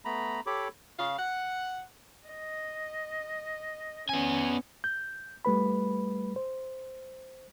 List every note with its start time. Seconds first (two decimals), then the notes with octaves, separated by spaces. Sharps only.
0.05 A3 B3 A#5 B5
0.46 G4 A4 C#5 B5 D6
1.00 C#3 F5
1.19 F#5
2.27 D#5
4.09 B3 C#4 G#5
4.84 G6
5.45 G3 A3 B4 B5
6.36 C5